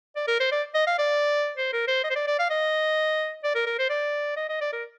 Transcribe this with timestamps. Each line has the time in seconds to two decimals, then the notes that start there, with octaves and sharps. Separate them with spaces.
0.16 D5
0.28 A#4
0.40 C5
0.52 D5
0.75 D#5
0.87 F5
0.99 D5
1.57 C5
1.73 A#4
1.88 C5
2.04 D#5
2.10 C5
2.15 D5
2.28 D5
2.39 F5
2.50 D#5
3.44 D5
3.55 A#4
3.67 A#4
3.79 C5
3.90 D5
4.37 D#5
4.49 D#5
4.61 D5
4.73 A#4